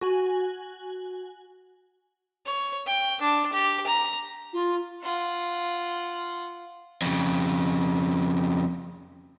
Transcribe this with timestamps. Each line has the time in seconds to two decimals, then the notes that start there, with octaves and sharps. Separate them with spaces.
0.01 F#4 G#5 F#7
2.46 C#5
2.87 G5
3.21 D4
3.53 G4
3.87 A#5
4.53 F4
5.03 F4 F#5
7.02 F2 C#3